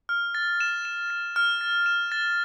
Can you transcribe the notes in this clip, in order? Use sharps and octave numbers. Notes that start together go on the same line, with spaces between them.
F6
A6
E7
E7
A6
F6
A6
E7
A6